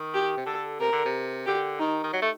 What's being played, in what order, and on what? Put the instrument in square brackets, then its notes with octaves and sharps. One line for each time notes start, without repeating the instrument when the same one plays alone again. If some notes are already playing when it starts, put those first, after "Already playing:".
Already playing: [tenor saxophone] D#3
[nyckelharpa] G4
[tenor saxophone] C3
[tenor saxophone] D3 [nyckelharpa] A4
[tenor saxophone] C3 [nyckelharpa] A#4
[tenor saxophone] D3
C3
[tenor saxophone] D3 [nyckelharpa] G4
[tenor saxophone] D#3 [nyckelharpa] D#4
[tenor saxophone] D#3
F#3
A3